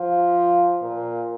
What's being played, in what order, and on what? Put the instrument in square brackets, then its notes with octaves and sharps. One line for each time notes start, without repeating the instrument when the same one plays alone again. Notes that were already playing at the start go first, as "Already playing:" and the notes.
Already playing: [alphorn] F3
A#2